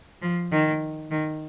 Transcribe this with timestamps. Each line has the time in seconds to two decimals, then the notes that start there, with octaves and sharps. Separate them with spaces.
0.22 F3
0.52 D#3
1.11 D#3